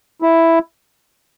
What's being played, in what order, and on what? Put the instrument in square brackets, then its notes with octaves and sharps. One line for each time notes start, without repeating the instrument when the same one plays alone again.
[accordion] E4